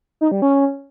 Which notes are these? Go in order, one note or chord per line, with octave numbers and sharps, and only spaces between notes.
D#4
G3
C#4